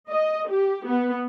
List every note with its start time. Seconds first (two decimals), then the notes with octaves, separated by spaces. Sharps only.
0.10 D#5
0.48 G4
0.86 B3